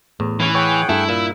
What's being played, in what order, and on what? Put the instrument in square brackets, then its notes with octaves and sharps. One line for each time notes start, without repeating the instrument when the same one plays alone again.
[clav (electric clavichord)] E2 [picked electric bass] A2
[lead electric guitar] E3 [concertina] C#4
[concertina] G#4 F#5 G5 [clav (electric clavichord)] C#5
[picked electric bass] G2 [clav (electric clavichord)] A3 [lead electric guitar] E4
[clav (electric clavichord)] A#2